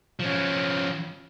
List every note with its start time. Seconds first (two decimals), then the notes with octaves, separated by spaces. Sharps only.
0.19 F3 C#4